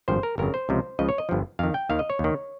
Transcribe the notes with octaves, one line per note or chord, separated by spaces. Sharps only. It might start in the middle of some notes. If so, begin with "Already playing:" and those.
G#1 G2 F3 C5
A#4
G1 F2 C#3 A#4
C5
C#2 C3 F3
C#2 C#3 F3 D#5
C#5
D#5
G1 G2 F3
F2 D#3 F5
G5
D#2 D#3 F5
D#5
C#5
D#2 D#3